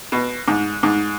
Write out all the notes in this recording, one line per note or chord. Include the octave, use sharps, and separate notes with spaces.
B2
G#2
G#2